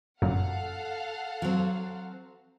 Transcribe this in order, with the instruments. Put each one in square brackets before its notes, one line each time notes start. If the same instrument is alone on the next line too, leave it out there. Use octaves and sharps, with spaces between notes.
[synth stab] G1 [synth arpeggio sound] F#2 A#2 [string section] A4 F5 F#5
[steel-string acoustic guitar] F#3 C4